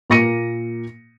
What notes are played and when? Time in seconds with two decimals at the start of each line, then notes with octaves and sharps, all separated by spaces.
0.10 A#2 A#3 A#6 C#7 D#7